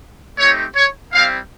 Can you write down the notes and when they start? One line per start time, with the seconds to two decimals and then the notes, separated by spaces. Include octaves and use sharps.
0.39 A3 C4 D#4 G4 C#5
0.75 C#5
1.12 G3 C4 E4 F5